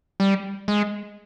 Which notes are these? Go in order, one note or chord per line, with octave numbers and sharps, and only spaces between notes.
G3
G#3